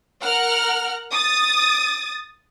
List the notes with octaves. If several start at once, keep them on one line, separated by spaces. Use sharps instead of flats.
A#4 F#5 F6
D#6 A6